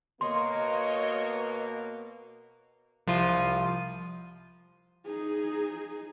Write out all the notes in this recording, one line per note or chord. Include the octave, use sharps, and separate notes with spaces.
B2 A#3 C#5 D#5 C6
C2 F3 F4 D#7
D#4 G#4